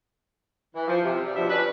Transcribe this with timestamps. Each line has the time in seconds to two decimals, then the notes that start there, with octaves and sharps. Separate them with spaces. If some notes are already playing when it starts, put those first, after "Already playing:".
0.75 E3
0.88 F3
1.04 C3
1.24 G3
1.36 D2 B2 F3 D4 E5
1.50 C#4 D4 B4